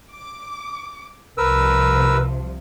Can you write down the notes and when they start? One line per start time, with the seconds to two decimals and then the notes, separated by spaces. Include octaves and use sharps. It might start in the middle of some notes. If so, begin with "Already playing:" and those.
0.14 D6
1.38 C2 C3 F3 A#4 B4 E6